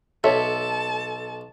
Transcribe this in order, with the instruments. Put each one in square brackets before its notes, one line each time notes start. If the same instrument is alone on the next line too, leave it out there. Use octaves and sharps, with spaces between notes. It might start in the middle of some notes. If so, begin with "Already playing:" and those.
[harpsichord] B1 [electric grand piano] A4 [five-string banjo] C#5 E5 [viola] A5